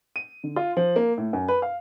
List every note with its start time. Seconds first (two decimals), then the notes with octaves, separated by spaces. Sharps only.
0.16 D#7
0.44 D3
0.56 F4
0.77 F3
0.96 A#3
1.18 A2
1.33 F#2
1.48 B4
1.62 F5